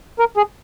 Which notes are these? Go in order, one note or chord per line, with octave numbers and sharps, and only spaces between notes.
A#4
G#4